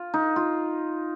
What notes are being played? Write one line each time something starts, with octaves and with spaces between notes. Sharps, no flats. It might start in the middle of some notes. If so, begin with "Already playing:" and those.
Already playing: F4
D#4
F4